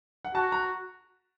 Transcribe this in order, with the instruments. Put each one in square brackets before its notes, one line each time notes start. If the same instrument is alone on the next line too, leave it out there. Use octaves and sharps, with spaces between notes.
[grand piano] F#5
[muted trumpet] F#4 [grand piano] A5
[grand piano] A#5